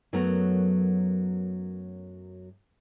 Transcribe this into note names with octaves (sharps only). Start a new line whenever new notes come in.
F#2 F#3 A3 B3 A#4